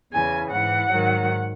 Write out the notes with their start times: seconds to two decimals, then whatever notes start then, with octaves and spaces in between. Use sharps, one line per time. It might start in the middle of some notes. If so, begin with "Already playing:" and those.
0.11 E2 C#3 E3 G#5
0.50 G#2 E3 F#5
0.88 G#2 D#3 F#3